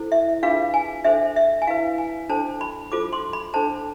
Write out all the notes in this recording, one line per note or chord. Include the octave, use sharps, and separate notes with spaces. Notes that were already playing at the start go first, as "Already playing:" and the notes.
Already playing: E4 A4 C5
E5
D4 F4 G#4 B4 F5
G#5
D4 A4 C5 E5
E5
G#5
E4 B4 F5
G#5
D4 A4 C5 A5
B5
F4 A4 C5 D6
C6
B5
D4 A4 C5 A5